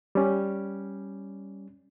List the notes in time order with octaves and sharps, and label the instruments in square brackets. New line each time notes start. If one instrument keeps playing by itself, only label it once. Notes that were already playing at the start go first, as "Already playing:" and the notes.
[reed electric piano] G3 C#4